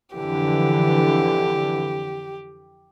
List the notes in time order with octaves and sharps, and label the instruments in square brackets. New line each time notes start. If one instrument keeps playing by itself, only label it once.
[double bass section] F2 D3 E3 [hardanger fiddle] G4